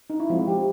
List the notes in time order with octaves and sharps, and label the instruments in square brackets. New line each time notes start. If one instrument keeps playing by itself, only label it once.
[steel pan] D#4
E4
F3 G#3 C4 F4
G4